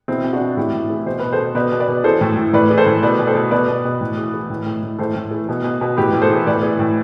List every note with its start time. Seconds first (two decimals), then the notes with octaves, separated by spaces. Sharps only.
0.08 B2 C4 E4
0.24 B2
0.33 D4 F#4
0.41 B2
0.57 A2 E4 G4
0.73 A2
0.90 E3
1.06 B2 C5
1.20 B2 B4
1.33 A4 C5
1.39 B2
1.55 B2 B4 D5
1.72 B2
1.80 B4 D5
1.88 B2
2.04 E3 A4 C5
2.21 A2
2.37 A2
2.53 A2 B4 D5
2.71 E3
2.78 A4 C5
2.86 A2
3.02 B2 B4 D5
3.19 B2
3.27 A4 C5
3.35 B2
3.51 B2 B4 D5
3.68 B2
3.85 B2
4.01 A2
4.18 E3
4.34 E3
4.50 A2
4.66 A2
4.83 A2
4.99 A2 A4 C5
5.15 A2
5.31 E3
5.49 B2
5.64 B2
5.81 B2
5.97 A2 G4 B4
6.13 A2
6.22 A4 C5
6.30 E3
6.47 A2 B4 D5
6.63 E3
6.79 A2